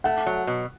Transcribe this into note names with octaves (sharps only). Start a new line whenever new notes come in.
A3 F#5
F#3
B2